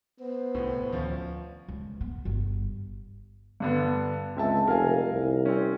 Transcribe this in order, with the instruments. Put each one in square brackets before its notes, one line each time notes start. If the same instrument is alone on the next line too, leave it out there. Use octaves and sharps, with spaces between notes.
[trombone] B3 [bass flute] C5
[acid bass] C2 [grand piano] A2
[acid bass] D2 [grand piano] F3 C#4
[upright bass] C#2
B3
G1
[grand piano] G2 D3 B3
[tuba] C#2 [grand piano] C4 E5 A5
[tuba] F1 [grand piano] A#4 F5 G#5
[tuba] C2
[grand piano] C4 C#4